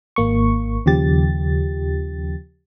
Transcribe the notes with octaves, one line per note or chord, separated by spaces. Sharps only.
G#1 A#3 C#6
D#2 C#3 F3 G4 A6